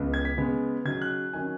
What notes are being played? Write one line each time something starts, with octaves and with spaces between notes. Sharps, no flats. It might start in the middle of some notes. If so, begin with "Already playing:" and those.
Already playing: C#2 C#3 B3
G#6
B6
C#3 G#3 B3
C#3 F#3 D#4 G#6
F#6
D#3 F#3 C#4 G#5